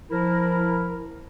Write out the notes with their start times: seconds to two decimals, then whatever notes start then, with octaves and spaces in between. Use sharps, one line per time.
0.10 F3 E4 A#4